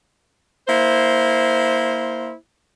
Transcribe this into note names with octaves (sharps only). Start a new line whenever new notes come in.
A#3 E4 C5